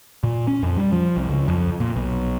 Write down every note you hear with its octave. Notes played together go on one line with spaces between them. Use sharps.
A#2
C#4
F2
G3
F3
C2
C#2
F2
A#2
B1